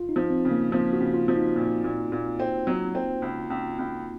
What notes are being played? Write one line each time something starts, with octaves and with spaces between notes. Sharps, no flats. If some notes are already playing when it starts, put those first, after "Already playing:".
Already playing: F4
D#4
F3
C4
C#3
A#3
F3 F4
F#4
C#3
F4
F3
D#4
A#2
A#2
A#2
C4
F#3
C4
C#2
C#2
C#2